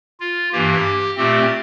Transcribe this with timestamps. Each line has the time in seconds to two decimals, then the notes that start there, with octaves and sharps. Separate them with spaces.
0.20 F4
0.52 G2 E3 A#3 G4
1.16 A#2 A3 C4 G4